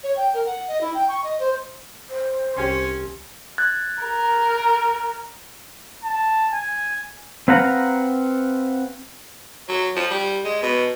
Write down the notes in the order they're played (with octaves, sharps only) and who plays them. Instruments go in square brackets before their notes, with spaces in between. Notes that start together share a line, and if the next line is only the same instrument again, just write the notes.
[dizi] C#5
G5
A#4
F#5
D#5
E4
G5
C#6
D#5
C5
[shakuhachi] C5
[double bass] C2 [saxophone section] C#4 [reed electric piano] G4 G#5 C6
[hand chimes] F#6 G#6 A6
[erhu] A#4
[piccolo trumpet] A5
G#5
[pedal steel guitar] C4 B4 F5 F#5 A#5
[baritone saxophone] F#3
F3
G3
G#3
B2